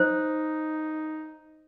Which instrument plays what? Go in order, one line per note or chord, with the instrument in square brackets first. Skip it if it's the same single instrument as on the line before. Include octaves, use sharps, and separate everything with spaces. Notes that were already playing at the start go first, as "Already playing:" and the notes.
Already playing: [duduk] D#4 [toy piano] C5